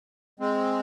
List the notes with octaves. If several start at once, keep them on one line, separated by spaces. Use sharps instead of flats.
G#3 C4